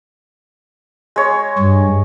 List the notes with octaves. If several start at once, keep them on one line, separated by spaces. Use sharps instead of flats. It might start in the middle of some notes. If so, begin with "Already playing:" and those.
G#3 C#5
G2